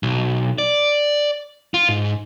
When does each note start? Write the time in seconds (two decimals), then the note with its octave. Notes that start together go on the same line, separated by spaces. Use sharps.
0.03 B1
0.58 D5
1.74 F4
1.89 G#2